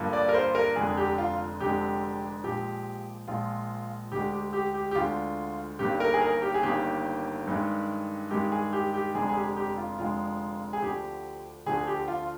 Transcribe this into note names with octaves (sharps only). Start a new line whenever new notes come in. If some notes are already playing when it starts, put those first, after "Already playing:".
Already playing: G2 D3 F3 A#3
D5
A#4
C5
A#4
F1 F2 D3 G#3 G#4
G4
F4
F1 F2 D3 G#3 G4
A#1 A#2 F3 G#3 G4
A#1 A#2 F3 G#3 F4
D2 D3 G#3 G4
G4
G4
G4
G4
D2 D3 G#3 F4
G1 G2 D#3 A#3 G4
A#4
G#4
A#4
G4
G#4
G1 G2 D#3 A#3 G4
G2 D#3 G#3
G2 D#3 G#3 G4
G#4
G4
G4
F1 F2 D3 G#3 G#4
G#4
G4
G4
F4
F1 F2 D3 G#3 F4
G#4
D2 D3 F3 G4
D2 D3 F3 G#4
G4
F4